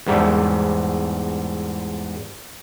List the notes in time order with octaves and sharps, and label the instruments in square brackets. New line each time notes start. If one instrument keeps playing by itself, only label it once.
[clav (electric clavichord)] E2 G#2 G3 A3